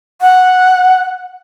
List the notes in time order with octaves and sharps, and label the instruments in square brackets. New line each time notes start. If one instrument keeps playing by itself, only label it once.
[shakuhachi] F#5